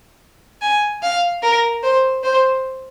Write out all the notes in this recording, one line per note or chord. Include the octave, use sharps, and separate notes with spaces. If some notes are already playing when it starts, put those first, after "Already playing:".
G#5
F5
A#4
C5
C5